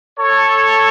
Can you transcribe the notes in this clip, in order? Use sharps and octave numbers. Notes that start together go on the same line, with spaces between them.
A4 C#5